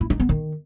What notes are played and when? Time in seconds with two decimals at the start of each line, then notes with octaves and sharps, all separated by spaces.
0.01 E4
0.10 D#4
0.20 B3
0.29 D#3